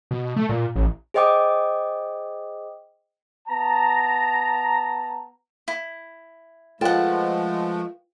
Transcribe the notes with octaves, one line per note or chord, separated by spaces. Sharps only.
B2
A3
A#2
A1
G#4 C5 D#5 G5 D6 D#6
B3 A5 A#5
E4
F3 G#3 A3 F4 B4 F#5 G5 A5